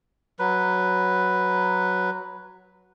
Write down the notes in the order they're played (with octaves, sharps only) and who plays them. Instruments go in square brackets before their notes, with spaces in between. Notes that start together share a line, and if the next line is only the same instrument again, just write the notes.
[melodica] F#3 B4